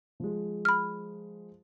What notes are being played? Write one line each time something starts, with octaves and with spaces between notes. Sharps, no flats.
F3 G#3
B5 F6